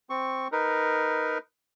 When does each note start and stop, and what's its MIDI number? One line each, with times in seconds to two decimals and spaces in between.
0.10 0.48 60
0.10 0.48 85
0.52 1.38 63
0.52 1.38 70
0.52 1.38 71